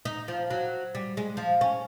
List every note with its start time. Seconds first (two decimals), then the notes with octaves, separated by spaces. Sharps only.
0.05 D#4
0.28 F3
0.50 F#3
0.95 G3
1.17 G#3
1.37 F3
1.61 C#4